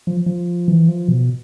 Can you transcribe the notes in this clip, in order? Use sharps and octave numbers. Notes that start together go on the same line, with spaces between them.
F3
F3
E3
F3
B2